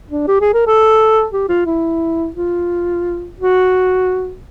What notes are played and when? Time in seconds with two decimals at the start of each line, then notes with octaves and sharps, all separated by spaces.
0.10 D4
0.28 G4
0.41 G#4
0.54 A#4
0.67 A4
1.32 G4
1.49 F4
1.66 E4
2.36 F4
3.40 F#4